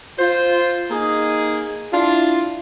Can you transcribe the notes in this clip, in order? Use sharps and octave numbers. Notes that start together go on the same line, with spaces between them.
F4 C5
A#3 D#4 G#4
D4 E4 F4